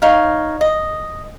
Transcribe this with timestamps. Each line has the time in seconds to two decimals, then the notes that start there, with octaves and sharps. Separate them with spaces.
0.02 D#4 C#5 F5
0.61 D#5